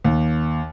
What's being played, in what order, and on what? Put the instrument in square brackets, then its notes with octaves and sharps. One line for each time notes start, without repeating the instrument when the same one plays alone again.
[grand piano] D#2